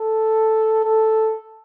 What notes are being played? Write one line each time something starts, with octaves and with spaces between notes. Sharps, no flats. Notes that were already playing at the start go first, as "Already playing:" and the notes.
Already playing: A4
A4